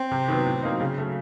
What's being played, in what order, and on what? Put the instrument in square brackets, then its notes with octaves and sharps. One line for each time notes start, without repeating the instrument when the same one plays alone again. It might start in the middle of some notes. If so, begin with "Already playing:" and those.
Already playing: [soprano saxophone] C4
[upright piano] C3
D#3 F#3 B3
A2
F#3 A#3 D#4
C#3
F#3 A3